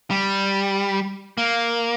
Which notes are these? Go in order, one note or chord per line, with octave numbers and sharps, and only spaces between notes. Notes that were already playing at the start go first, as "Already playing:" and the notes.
G3
A#3